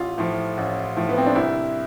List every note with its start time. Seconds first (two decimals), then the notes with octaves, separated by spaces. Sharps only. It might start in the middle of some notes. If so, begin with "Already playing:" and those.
Already playing: A1 F4
0.18 A2 F3
0.57 A1
0.97 A2 F3
1.09 B3
1.18 C4
1.26 D4
1.35 C2 E4